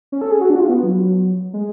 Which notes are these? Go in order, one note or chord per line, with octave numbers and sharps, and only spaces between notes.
C#4
A4
G#4
F#4
D4
F#4
F4
B3
F#3
G#3